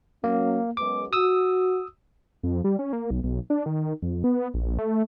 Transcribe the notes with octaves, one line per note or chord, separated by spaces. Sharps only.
F#3 A#3 C#4
F#2 G#3 B3 D6
F#4 D#6 E6
F2
G3
C#4
A#3
B1
B1
D4
D#3
F2
B3
A#1
A3